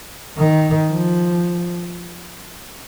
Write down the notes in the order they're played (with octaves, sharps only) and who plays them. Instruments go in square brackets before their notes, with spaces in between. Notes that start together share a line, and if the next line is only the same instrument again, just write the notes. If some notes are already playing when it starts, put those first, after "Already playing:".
[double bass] D#3
F3